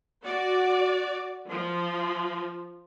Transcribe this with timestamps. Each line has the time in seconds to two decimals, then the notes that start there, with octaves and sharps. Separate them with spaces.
0.24 F#4 D5
1.50 F3